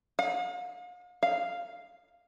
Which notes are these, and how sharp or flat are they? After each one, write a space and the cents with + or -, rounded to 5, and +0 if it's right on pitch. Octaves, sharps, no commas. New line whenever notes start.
F5 +40
F5 -5